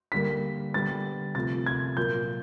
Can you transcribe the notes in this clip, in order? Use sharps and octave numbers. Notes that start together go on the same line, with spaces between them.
D3 G3 A#3 B6
D3 G3 B3 A6
C3 F3 A3 A6
G#6
A#2 F#3 A#3 G6